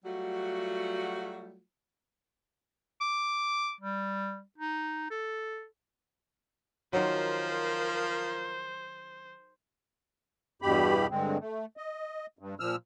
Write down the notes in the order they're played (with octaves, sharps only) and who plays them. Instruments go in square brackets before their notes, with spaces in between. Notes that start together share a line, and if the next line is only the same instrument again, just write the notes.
[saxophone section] F#3 G3 A3 F4 F#4
[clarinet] D6
G3
D#4
A4
[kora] D#3 F#3 [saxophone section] F3 A#4 [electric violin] C5
[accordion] E2 G2 B2 G4 B5
G2 D3 G#3 C4
A3
D#5
G2
A#2 F3 E6 F6